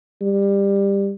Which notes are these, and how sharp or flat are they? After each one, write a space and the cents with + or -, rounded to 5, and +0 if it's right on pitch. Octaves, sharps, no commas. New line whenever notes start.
G3 +20